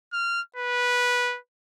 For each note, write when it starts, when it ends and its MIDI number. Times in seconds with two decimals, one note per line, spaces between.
0.13 0.41 89
0.56 1.38 71